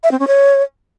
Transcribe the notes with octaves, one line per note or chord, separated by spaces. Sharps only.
E5
C4
C#4
C#5